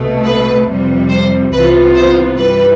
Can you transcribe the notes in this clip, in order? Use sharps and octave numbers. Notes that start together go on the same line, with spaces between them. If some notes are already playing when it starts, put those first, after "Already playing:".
Already playing: C2 B2 A3
B4
F2 C3 G3
C5
C2 C3 E3 B3 F4 B4
C5
G2 E3 G3 B4